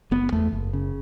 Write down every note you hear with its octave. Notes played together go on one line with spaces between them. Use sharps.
F#1 B3
E2 A3
F#1
C#3